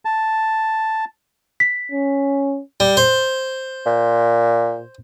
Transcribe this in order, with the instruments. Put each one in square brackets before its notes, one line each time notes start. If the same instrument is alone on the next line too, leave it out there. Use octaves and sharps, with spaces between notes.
[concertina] A5
[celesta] B6
[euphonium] C#4
[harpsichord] G3
C5
[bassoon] A#2